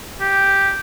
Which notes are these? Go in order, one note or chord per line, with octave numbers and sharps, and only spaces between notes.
G4